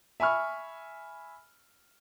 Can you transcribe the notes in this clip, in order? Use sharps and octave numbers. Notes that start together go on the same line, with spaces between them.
E5 G#5 B5 C#6 F6